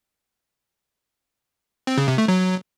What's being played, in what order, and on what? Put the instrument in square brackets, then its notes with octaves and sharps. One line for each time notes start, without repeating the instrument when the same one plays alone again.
[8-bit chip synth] C4
C#3
C3
A3
F#3